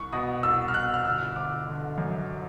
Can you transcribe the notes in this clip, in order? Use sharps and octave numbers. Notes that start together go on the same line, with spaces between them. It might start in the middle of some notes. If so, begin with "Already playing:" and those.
Already playing: C2 C#6
B2 D#6
C2 E6
F6
B2 F#6
F6
G1 E6
G1 D6
D3
F#2